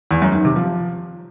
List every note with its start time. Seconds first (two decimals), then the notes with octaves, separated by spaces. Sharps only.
0.11 E2
0.22 F#2
0.33 D#3
0.45 C3
0.56 F3